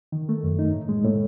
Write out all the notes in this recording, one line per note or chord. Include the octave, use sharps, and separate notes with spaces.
D#3
A3
F#2
D#4
A2
G#3
A2